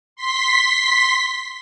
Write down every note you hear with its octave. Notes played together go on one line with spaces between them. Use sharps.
C6 B6